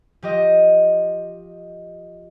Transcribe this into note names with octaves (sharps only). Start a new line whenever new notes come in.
F3 G4 D#5